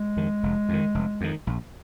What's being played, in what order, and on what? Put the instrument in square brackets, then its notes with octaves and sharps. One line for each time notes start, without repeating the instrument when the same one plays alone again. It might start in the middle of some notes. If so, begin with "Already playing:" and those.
Already playing: [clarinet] G#3
[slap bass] F2 D#3
F1
F2 D#3
F1
F2 D#3
A#1